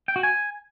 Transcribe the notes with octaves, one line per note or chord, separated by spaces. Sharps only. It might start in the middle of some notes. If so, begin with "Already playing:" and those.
G5
F#4
G#5